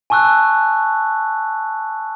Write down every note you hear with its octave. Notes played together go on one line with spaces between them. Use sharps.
G#5 A5 C#6 E6 F#6